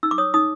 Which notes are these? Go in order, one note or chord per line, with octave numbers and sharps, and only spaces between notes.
D#4 E6
D6
C#5 D#6
D#4 D#6